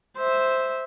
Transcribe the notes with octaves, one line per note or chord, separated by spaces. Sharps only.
C5 E5